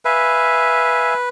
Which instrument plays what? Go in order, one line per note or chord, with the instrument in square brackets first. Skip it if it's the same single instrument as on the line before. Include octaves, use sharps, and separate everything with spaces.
[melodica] B4 [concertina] E5 F5 G#5